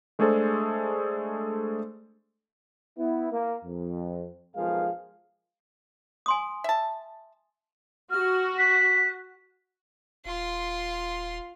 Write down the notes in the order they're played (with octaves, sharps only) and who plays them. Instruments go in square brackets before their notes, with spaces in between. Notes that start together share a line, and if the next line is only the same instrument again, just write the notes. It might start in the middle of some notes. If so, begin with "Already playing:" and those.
[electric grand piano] G#3 A3 D4 G#4 A4 C5
[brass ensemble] B3 E4
A#3
F2
B1 F3 G#3 G#4 A#4 F5
[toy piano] G#5 C6 D#6
[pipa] E5 A5
[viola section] F#4 [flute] F6
[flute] F#6 [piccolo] B6
[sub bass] D#1 [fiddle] F4 C6